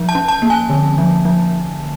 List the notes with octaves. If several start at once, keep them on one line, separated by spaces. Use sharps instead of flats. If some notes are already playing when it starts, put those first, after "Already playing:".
Already playing: F3
A5
C#4
A5
A#3
G#5
D3
F3
F3